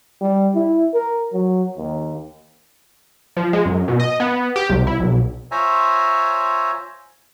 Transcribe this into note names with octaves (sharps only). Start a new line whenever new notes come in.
G3
E4
A#4
F#3
D#2
F3
G#3
F#2
B2
D#5
B3
G4
C2
E4
B1
F4 C5 C#5 E5 G#5 A#5